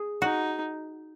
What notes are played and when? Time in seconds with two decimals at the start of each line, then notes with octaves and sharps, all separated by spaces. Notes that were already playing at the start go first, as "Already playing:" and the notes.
Already playing: G#4
0.22 D#4 F#4